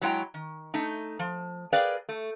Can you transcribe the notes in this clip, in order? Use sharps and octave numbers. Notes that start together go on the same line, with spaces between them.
F#3 G#3 E4 D#5 G5 A#5
D#3
A3 D#4
F3
G#4 A#4 B4 D5 F5 G5
A3